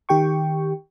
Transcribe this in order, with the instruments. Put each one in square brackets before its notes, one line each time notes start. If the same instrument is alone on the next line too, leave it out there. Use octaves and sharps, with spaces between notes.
[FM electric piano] D#3 G4 G5 C#6